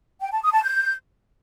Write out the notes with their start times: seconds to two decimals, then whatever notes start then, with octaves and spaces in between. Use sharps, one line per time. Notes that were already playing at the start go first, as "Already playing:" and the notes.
0.21 G5
0.32 A5
0.42 D#6
0.53 A5
0.63 G6